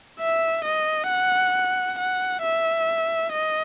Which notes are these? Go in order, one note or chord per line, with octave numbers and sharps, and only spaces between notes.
E5
D#5
F#5
F#5
E5
D#5